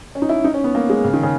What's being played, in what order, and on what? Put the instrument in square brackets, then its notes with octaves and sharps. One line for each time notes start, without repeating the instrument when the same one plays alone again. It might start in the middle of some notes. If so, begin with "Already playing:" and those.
[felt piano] C#4
D#4
E4
D#4
C#4
B3
A#3
G#3
C#3
D#3
C#3